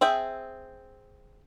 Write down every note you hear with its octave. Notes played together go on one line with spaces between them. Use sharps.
C4 G#4 E5 G5